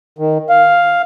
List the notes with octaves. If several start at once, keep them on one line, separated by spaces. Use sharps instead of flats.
D#3
F5